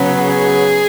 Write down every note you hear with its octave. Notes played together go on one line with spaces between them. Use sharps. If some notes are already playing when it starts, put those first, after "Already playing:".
Already playing: C#3 F#3 B3
G#4